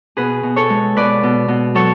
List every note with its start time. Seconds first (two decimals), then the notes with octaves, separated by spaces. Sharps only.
0.17 B2 G#4 B4
0.43 B2
0.56 A4 C#5
0.70 G#3
0.96 B2 B4 D5
1.23 B2
1.48 B2
1.75 F#3 A4 C#5